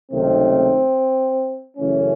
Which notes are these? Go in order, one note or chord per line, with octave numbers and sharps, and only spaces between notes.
C#2 C3 D#3 F#3 A3 C4
F#2 C#3 E3 A3 C#4